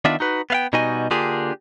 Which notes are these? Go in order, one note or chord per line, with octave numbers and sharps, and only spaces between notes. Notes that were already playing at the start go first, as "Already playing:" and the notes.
D#3 B3 D4 F4 D5 E5
D#4 F#4 B4
B3 F5 G5
B2 G3 D#4 F#4 D#5 G#5
D3 A#3 D4 F4 G4 G#4